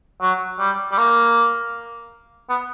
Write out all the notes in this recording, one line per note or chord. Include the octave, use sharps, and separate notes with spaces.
F#3
G3
G3
A#3
B3